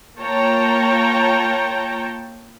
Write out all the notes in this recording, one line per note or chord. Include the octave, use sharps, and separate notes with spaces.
A#3 F4 C#5 G5 A5 A#5